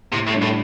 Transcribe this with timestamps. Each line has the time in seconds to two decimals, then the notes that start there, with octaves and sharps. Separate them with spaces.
0.13 A2 C3
0.27 A2
0.34 G3 D4
0.42 A2